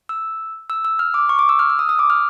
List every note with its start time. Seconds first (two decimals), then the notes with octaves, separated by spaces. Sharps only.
0.09 E6
0.70 E6
0.85 E6
0.99 F6
1.14 D6
1.29 C#6
1.39 D6
1.49 E6
1.59 F6
1.70 E6
1.79 D#6
1.89 D#6
1.99 D6
2.10 F6